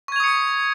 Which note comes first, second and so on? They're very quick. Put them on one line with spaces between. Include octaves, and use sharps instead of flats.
C#6 G#6 F7 D#6 C#7